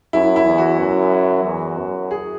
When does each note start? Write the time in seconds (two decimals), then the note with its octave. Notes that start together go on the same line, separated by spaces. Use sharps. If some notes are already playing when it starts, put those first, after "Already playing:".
0.13 F#2 E4
0.36 E4
0.46 E2
0.58 F#4
0.79 F#2
1.44 E2
1.78 F#2
2.11 G#4